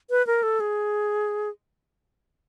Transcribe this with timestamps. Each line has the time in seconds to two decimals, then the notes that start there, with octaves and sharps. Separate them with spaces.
0.10 B4
0.27 A#4
0.43 A4
0.60 G#4